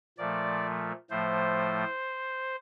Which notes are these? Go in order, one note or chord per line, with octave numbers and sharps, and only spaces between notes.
A#2 F3 A3 D5
A2 F3 A3 C5